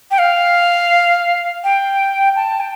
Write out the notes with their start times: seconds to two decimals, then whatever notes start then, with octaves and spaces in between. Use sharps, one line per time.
0.11 G5
0.19 F5
1.64 G5
2.36 A5
2.60 G5